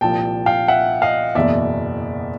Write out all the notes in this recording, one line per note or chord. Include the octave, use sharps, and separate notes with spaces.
C2 A#2 F3 G5 A5
F5 G5
E5 F#5
D#5 F5
F#1 E2 B2 D5 E5